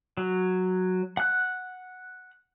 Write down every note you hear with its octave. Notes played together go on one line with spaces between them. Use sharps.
F#3
F#5 F#6